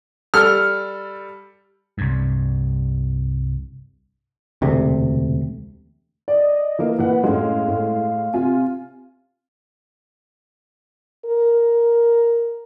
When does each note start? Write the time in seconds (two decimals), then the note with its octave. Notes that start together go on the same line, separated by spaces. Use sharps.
0.34 G3 A4 F6
1.98 C2 G2
4.62 E1 D2 C3
6.28 D5 D#5
6.79 E3 A#3 D#5
6.99 A#2 E3 B4 F#5
7.24 F#2 A2 G#3 F5
7.68 A2
8.34 C3 F4 G#5
11.25 A#4